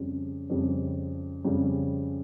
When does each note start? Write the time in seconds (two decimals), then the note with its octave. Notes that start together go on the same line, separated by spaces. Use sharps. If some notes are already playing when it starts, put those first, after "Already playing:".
Already playing: F2 C#3 G3 C#4
0.50 F2 C#3 G3 C#4
1.44 F2 C#3 G3 C#4